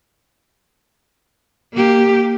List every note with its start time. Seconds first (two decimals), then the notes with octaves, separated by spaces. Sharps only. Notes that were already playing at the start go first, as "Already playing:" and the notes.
1.74 A#3 G4